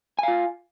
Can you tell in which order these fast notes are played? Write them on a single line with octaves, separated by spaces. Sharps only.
G#5 F5 F4